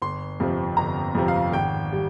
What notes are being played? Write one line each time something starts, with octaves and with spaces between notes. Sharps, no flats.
G1 C6
F2 C3 F3
G1 A#5
F2 C3 F3
F5
G#1 G5
G3